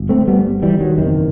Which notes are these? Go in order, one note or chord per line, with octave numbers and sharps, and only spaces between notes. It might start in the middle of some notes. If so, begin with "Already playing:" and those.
Already playing: G1
A3 C4
G3 B3
E3 G3
D#3 F#3
F#1 E2 C3 D#3